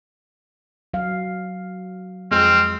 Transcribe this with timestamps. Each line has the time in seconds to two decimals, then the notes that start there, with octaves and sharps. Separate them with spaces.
0.94 F#3 F5
2.31 F2 G#3 C4 C6 F6